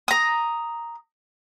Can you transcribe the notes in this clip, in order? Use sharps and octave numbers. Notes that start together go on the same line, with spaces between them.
A#5 D#6